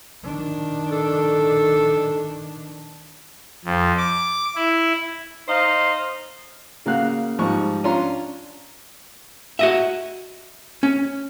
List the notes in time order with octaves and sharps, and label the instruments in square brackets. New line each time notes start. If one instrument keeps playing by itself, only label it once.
[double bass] D#3 D4
[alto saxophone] A4
[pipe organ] F2
D6
E4
[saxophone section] D#4 C5 D#5 F5
[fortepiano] C#3 A#3 F#4 F5 F#6
G#2 F3 G3 C#6
C#4 D4 F4 C#5 A#5 C6
[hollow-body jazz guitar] F#4 D#5 E5
C#4